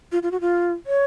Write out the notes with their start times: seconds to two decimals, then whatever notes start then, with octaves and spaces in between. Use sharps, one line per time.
0.12 F4
0.23 F4
0.31 F#4
0.41 F4
0.86 C#5